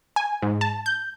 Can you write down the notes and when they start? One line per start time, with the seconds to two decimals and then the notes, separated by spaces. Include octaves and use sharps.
0.16 G#5
0.42 G#2
0.61 A5
0.86 G6